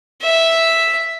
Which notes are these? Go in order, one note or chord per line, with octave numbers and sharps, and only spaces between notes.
E5